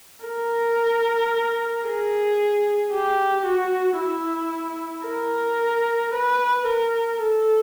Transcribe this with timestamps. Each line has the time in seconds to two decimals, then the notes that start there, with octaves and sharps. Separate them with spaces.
0.25 A#4
1.86 G#4
2.93 G4
3.46 F#4
4.00 E4
5.07 A#4
6.15 B4
6.68 A#4
7.21 A4